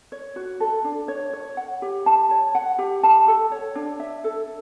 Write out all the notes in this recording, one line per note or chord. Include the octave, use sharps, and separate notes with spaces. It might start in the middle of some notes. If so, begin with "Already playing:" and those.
C#5
F#4
A4
D4
C#5
C#5
F#5
G4
A5
C#5
F#5
G4
A5
A4
C#5
D4
E5
A4